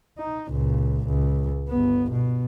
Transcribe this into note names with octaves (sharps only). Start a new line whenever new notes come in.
D#4
C#2 A#2
C#2
G1 B3
B2